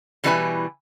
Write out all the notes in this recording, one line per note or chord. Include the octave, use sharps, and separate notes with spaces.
B2 E3 G3 E4 B4 G#5